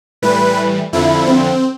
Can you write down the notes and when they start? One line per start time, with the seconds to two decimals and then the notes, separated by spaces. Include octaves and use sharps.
0.22 A2 E3 G3 B4
0.93 F2 D3 F3 E4
1.27 C4